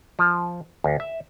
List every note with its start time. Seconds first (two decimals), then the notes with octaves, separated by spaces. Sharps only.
0.19 F3
0.84 D2
1.00 E5